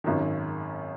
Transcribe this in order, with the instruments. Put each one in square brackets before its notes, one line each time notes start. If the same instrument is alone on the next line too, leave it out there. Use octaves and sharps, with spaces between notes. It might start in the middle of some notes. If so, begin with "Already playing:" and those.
[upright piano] G#1 F#2 D#3